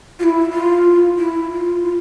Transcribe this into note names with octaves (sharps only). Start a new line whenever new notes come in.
F4
E4
F4
E4
F4
F4